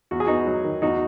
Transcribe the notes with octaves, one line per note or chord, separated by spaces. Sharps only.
E2 F#4
G#4
B3 D#4 F#4
F#3
D#3
E2 D#4 F#4